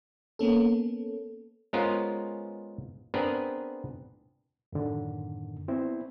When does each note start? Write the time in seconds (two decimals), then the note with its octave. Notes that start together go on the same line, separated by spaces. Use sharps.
0.39 A#3 B3 C#4 A4
1.73 G#3 B3 C#4 F4 A#4 C5
3.14 B3 C4 D4 G#4 A#4 B4
4.73 F#2 A2 D3 D#3
5.68 B3 C4 E4